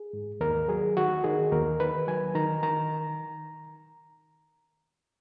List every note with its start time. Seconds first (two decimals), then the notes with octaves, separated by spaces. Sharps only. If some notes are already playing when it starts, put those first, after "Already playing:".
Already playing: G#4
0.13 G#2
0.40 D#2 A#4
0.68 F#3 G#4
0.97 D#3 F#4
1.24 D#3 G#4
1.52 D#2 A#4
1.80 D#3 B4
2.07 F#3 G#5
2.35 D#3 A#5
2.63 D#3 A#5